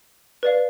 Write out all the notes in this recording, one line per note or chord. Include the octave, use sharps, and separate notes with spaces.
B4 D5 F5